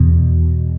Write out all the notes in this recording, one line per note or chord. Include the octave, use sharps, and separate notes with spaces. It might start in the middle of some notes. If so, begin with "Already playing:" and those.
Already playing: E2 B2